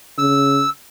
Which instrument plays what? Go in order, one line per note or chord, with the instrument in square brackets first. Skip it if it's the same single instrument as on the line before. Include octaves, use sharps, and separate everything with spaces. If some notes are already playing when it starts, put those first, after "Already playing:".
[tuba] C#3 [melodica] E6